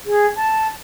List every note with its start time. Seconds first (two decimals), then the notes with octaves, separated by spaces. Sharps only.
0.06 G#4
0.36 A5